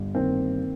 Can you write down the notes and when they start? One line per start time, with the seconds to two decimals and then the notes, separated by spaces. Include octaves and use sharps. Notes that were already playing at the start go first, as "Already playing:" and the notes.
Already playing: G1
0.15 D#3 A#3 C4